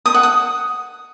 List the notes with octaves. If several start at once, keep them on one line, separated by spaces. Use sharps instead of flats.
D#6
F#5
D#6